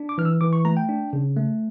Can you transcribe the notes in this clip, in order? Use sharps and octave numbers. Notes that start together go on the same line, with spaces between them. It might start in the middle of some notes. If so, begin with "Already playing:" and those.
Already playing: D4
D6
E3 F6
E6
E3 D6
C#6
A3 A#5
G5
D4
C#3
A3